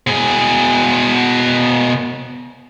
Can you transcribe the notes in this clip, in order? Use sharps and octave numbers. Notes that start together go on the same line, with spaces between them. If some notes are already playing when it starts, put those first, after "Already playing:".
B2 G#4